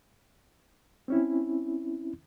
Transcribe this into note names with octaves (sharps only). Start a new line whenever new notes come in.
C4 C#4 E4